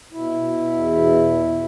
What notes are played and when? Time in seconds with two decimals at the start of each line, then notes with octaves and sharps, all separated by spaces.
0.12 B2 E4
0.42 B2
0.72 E2
1.02 B2
1.31 B2